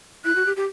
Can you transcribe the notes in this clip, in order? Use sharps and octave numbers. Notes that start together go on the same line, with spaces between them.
E4 F#6
F#4
G4
G4